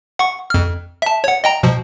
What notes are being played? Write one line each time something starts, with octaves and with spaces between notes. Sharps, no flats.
F#5 C#6
F2 F6
E5 A5
C#5 F#5
D#5 G5 A#5
B2 F3